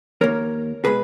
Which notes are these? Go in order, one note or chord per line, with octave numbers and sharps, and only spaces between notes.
D#2 D#3 A#3 A#4 C#5
B2 G#3 G#4 B4